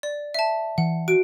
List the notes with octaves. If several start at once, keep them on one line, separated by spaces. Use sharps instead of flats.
D5
E5 A5
E3 F#5
F#4 D7